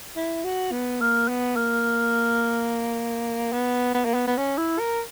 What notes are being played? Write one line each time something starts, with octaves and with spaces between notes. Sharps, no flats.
E4
F#4
B3
A#3
B3
A#3
B3
B3
A#3
B3
B3
C#4
E4
A#4